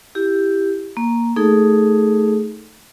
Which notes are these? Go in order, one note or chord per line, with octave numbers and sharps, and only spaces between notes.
E4 G4
A#3
A3 D#4 G#4 A4